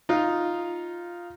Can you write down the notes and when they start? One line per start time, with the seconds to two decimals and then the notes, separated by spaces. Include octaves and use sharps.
0.09 D#4 F4